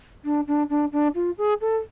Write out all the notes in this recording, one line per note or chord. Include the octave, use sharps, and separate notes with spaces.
D4
D4
D4
D4
F4
G#4
A4